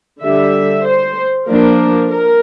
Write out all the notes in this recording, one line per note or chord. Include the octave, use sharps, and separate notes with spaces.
D3 G3 D4 E5
C5
F3 A#3 D4 A#4
A#4